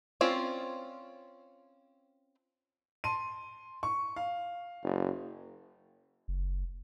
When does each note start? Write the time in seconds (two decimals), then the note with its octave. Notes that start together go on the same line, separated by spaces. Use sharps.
0.21 C4 C#4 F4 D5
3.04 A5 C6 D#7
3.83 C#6
4.16 F5
4.83 F#1
6.28 F#1